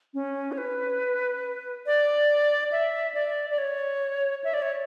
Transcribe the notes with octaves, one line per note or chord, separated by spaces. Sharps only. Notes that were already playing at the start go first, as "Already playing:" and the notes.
C#4
C#5
B4
D5
E5
D5
D5
C#5
E5
D5
C#5